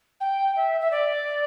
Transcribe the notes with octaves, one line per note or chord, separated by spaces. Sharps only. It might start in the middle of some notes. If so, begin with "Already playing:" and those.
G5
E5
E5
D5